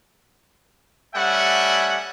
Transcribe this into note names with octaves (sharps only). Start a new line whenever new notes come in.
G3 A3 C#4 E5 F#5 G#5